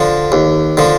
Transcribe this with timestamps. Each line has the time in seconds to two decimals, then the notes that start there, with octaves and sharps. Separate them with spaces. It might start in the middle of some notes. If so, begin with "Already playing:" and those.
Already playing: D3 F3
0.32 D#2
0.77 D3 F3